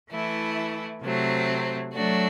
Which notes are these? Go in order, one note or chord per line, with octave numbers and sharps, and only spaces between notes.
E3 A3 E4
C3 F#3 A3 C4
F#3 A3 D4 F#4